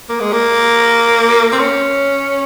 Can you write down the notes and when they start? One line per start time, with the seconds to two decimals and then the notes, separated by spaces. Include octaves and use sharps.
0.09 A#3
0.20 G#3
0.33 A#3
1.52 C4
1.59 C#4